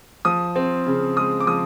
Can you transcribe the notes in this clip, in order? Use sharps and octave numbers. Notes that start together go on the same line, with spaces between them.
F3 D#6
C4
C#3
G#3 D#6
D6
F3 D#6